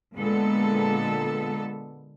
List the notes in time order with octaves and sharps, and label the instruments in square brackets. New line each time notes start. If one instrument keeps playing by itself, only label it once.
[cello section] A#2 D3 G#3 B3 A4